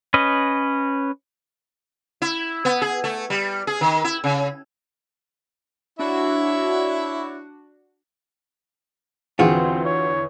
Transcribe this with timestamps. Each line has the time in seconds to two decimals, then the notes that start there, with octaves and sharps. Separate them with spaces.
0.14 C#4 B4 D#5
2.22 E4
2.65 B3
2.82 G#4
3.04 A3
3.30 G3
3.67 G#4
3.81 D#3
4.04 E4
4.24 C#3
5.99 D4 E4 F#4 C#5 E5
9.39 E2 D3 E3 C4 F4 F#4 G#4
9.85 C#5